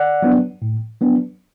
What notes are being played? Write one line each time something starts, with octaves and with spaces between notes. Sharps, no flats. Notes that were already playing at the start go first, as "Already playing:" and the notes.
Already playing: D5 F#5
F#3 B3 D4
A2
F#3 B3 D4